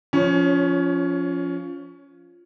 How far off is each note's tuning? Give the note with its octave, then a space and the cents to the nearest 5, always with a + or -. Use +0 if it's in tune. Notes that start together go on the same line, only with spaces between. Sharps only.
F3 +0 C#4 +20 C#5 -5